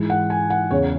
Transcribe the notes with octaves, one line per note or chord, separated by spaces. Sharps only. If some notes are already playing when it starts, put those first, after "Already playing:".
Already playing: G#2 E3
F#5
G#5
F#5
E2 C#3 E3 C#5